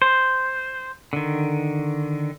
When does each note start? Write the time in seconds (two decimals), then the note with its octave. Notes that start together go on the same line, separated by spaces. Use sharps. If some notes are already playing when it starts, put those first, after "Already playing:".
0.02 C5
1.13 D3 D#3